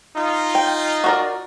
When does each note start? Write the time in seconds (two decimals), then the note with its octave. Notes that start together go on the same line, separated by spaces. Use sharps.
0.17 D#4 F4
0.55 G5
1.04 F#4 A#4 D5